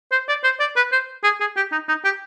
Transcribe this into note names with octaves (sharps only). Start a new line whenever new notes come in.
C5
D5
C5
D5
B4
C5
G#4
G#4
G4
D#4
D#4
G4